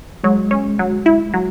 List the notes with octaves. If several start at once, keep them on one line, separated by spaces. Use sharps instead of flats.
F#3 G#3
C#4
F#3
E4
F#3